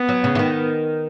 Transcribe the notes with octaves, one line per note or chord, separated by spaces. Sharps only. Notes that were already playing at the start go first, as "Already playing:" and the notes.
Already playing: B3
F#3
C#3
E3
D#3